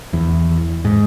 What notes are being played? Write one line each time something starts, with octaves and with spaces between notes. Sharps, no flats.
E2
G#2